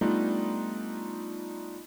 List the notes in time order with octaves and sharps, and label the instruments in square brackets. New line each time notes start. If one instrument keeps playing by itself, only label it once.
[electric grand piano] G3 A3 B3 D4 D#4 F4